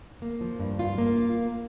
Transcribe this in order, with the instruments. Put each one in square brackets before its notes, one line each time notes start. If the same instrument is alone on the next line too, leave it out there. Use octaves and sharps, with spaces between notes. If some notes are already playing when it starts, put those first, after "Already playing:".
[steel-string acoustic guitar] A#3
F3
G2
F4
A#3